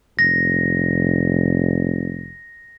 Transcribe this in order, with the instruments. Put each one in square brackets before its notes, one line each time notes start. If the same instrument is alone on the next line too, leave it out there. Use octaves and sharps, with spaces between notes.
[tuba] F1 [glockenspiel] A#6